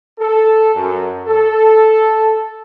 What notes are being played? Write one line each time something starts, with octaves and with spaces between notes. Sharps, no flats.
A4
F#2
A4